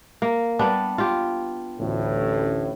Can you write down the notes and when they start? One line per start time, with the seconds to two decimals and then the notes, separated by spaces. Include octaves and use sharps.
0.22 A#3
0.59 G3 B3 D4
0.98 F4 G4
1.79 A1 D2 A2